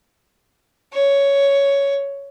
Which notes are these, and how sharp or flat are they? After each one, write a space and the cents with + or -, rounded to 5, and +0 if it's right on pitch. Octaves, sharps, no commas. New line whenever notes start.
C#5 +10